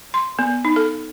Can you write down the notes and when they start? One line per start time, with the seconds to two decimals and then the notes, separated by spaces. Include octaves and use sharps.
0.14 C6
0.39 B3
0.65 D#4
0.76 A4